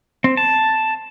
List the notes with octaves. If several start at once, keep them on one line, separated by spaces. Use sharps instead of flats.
C4
A5